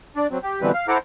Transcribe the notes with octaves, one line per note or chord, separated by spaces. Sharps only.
D4 D5
F#3 C4
G4
B2 D3 E3 G3 C4 B4
F5
E4 A4 C5 F#5 A#5 D6